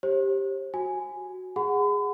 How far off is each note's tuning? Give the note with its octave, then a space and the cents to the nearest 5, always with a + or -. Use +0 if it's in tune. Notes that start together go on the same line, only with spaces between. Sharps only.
G4 +0 C5 +40
F#4 +0 G#5 +0
G#4 -15 F#5 +0 B5 +45